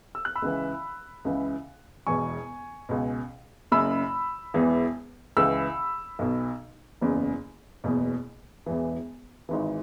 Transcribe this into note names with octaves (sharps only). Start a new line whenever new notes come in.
E6
F#6
B5 E6
C#2 C#3 E3
C#2 C#3 E3
E1 E2 B2 G#5 C#6
C#2 B2
F#1 F#2 C#3 B5 E6
E1 E2 E3
C#2 C#3 E3 B5 E6
B1 B2
F#1 E2 C#3
F#1 E2 B2
E1 E2 E3
G#1 G#2 E3